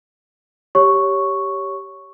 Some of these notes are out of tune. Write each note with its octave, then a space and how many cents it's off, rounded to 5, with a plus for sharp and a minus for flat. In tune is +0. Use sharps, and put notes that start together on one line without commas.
G4 +0 C#5 +0 C#6 +0